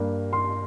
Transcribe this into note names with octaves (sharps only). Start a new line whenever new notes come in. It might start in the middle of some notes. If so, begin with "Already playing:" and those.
Already playing: G2 G3 A#3
C6